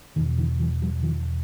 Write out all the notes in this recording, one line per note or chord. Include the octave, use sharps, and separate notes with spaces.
E2 B2 D#3
D3 E3
E3 F#3
F3 G3
D#3 F3